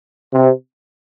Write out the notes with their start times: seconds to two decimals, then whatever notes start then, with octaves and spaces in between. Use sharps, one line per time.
0.33 C3